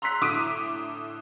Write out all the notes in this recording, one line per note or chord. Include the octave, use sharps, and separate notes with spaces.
A#5 C6 E6 F#6 B6
A2 D3 D6 D#6 D7 D#7